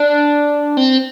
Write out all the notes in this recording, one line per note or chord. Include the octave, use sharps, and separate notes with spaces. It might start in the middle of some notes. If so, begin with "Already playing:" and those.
Already playing: D4
C4